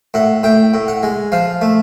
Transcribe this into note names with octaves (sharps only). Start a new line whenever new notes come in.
A2 F#5
A2 G5
A2
F#5
G#3
F3 F5
A3